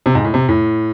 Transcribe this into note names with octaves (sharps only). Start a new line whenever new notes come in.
C3
G#2
A2
C3
A2